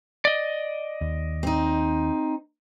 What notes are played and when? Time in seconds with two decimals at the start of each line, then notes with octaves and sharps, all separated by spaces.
0.25 D5 D#5
1.01 D#2
1.43 C4 D#4